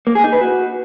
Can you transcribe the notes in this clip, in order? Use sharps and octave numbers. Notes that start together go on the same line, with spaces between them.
A#3
G#4
D#4
B4
F#4